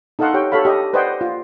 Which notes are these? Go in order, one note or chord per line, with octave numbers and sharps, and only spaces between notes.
D#4 A4 D#5 F5 F#5 C6
G4 C#5 G5
G4 A4 C#5 F5 B5
G4 D#5
B4 C5 D5 D#5 F#5 G5
F4